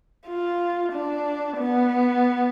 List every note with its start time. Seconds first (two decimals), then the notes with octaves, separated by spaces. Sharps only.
0.27 F4
0.93 D4
1.58 B3